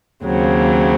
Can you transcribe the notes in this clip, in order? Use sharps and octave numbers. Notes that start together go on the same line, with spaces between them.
D#2 C#3 F#3 C4